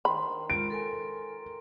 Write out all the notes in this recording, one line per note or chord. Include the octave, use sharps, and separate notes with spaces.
D#3 C5 B5
G#3 F4 D7
A4 A#4 G#5